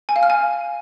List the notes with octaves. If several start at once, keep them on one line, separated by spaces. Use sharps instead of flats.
G#5
F5
F6
G#5